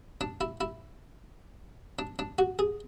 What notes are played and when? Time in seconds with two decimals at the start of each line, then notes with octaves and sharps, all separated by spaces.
0.21 D4
0.41 E4
0.61 E4
1.99 D4
2.19 D4
2.39 F#4
2.59 G#4